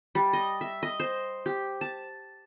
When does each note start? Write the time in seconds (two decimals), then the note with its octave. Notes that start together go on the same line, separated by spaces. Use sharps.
0.15 G3
0.33 D#5
0.61 E5
0.83 D#5
1.00 C5
1.46 G4
1.81 A5